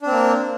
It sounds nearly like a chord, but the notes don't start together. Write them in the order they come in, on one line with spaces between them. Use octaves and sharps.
D4 C4 A#3